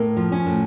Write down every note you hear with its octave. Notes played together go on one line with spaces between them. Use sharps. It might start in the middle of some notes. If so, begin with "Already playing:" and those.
Already playing: A2 A#3
F3
C#4
A2